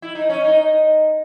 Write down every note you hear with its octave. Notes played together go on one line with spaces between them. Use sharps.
E4
D#4
C#4
D#4